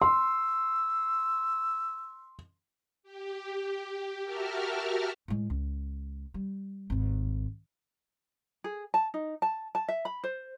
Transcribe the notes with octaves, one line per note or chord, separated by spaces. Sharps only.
C6 E6
G4
F#4 G4 A#4 E5 A5 F6
A2 G#3
C#2
G3
G#1 D#2
G#4
A5
D#4
A5
A5
E5
B5
C5